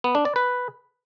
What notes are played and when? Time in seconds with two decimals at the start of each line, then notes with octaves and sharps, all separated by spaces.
0.04 B3
0.15 D4
0.25 D5
0.36 B4